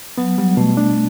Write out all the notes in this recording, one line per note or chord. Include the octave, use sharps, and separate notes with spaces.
F#3 B3
F#3 G3
B2 A3
D4